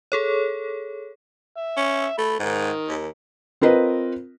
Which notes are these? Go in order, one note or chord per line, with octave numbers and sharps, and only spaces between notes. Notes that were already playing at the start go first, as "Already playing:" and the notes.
G#4 A4 C#5
E5
C#4
A3 B5
G#2 D#3
D#2
C4 F4 A#4 B4 D#5